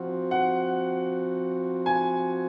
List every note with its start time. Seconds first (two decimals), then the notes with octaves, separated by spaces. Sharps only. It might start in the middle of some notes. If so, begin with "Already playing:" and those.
Already playing: F3 C4 F#4
0.31 F#5
1.86 G#5